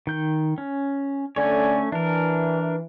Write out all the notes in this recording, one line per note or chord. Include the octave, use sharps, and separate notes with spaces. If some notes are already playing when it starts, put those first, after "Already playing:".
D#3 G6
C#4
D3 A3 C#4 C#5 D5 G#5
E3 D4 A#4